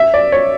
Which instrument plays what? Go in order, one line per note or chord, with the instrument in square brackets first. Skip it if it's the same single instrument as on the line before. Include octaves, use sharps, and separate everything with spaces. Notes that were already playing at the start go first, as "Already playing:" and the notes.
Already playing: [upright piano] E5
D5
C#5